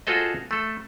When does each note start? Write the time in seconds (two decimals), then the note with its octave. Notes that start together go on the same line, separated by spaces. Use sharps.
0.07 F4 F#4 G#4 A4 C5 D#5
0.51 A3 A4